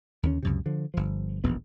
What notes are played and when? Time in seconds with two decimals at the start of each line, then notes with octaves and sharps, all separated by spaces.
0.23 D#2 D3 A#3 C#4
0.43 C#2 F#2 C3
0.66 D3 F3
0.94 G1 F3
1.44 E1 A#1 D#2 B3